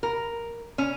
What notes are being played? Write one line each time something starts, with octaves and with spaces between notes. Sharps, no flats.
A#4
C#4